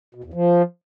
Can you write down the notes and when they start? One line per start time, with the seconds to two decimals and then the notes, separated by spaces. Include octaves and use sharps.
0.15 B2
0.24 E2
0.34 F3